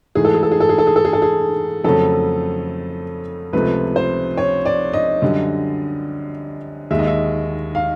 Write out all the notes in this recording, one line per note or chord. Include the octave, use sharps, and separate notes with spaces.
G#2 E3 A3 G#4
A4
G#4
A4
G#4
A4
G#4
A4
G#4
A4
G#4
A4
G#4
F2 C#3 F#3 A3 A4
C#2 C3 F3 A3 B4
C5
C#5
D5
D#5
F#2 D3 G3
D#2 D#3 G#3 E5
D#5
E5
F5